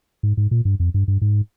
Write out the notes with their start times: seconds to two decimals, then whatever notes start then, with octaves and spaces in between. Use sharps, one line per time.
0.23 G#2
0.37 G#2
0.51 A#2
0.65 G2
0.80 F2
0.94 G2
1.08 G2
1.22 G#2